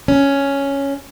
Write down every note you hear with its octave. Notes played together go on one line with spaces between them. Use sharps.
C#4